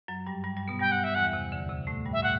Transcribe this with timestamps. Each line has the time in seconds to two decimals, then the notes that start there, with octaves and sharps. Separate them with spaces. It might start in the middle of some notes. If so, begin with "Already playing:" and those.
0.08 F#2 F#3
0.26 G2 G3
0.44 G2 G3
0.57 G2 G3
0.68 B2 B3
0.80 G2 G3 G5
0.92 F#5
1.04 E5
1.15 E2 E3 F#5
1.33 C3
1.52 D2 D3
1.69 C3
1.87 A2 A3
2.06 G2 G3
2.13 E5
2.23 A2 A3 F#5